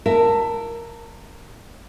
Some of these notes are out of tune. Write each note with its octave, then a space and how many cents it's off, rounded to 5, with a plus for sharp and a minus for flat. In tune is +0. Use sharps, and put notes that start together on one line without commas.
A#4 +0 E5 +15 A5 +20